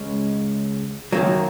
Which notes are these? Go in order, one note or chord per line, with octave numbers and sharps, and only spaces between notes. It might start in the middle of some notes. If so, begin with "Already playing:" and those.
Already playing: C#2 C#3 G#3 C#4
F#2 D#3 F#3 A#3